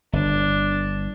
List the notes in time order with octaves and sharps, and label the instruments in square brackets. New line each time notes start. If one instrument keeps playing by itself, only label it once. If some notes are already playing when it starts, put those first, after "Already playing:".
[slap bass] G1 [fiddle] D4